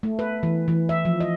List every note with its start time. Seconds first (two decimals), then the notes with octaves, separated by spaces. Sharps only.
0.03 A3
0.19 B4
0.43 E3
0.68 E3
0.89 E5
1.05 F3
1.20 D#5